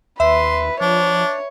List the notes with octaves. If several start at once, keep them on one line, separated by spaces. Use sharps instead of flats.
D#2 B4 E5 C6
F3 D4 C#5